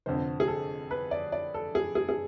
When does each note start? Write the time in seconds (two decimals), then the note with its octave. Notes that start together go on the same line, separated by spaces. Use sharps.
0.06 F1 F2 D3 C5
0.40 G#4
0.48 A4
0.91 B4
1.11 D5
1.32 D5
1.54 A4
1.75 G#4
1.95 G#4
2.09 G#4